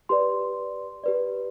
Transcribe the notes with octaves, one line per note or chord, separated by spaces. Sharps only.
G4 B4 D5 C6
G4 B4 D5